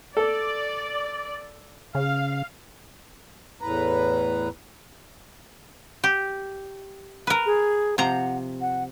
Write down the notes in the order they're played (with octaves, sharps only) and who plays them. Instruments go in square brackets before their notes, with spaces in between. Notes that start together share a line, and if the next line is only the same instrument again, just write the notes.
[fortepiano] A4 [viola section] D5
[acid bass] C#3 [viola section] F5
[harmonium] E2 A2 B4 A#5
[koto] G4
A#4 B4
[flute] G#4
[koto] C3 F3 A#5 [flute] F#5
[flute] F#5